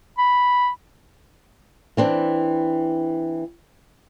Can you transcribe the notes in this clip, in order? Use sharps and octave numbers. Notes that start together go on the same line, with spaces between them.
B5
E3 C4 D4